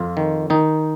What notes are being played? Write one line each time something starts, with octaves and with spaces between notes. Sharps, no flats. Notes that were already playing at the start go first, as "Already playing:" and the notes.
Already playing: F2 F4
D#3
D#3 D#4